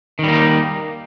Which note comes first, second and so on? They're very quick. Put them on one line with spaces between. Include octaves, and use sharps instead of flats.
D#3 G3 A#3 D#4